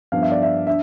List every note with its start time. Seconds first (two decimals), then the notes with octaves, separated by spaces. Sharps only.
0.12 G2 F3 B3 D4 F5
0.22 E5
0.32 D5
0.42 E5
0.67 D4 E5